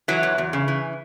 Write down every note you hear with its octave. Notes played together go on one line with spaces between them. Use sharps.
E3 F#3
E2
E2
C#3
E3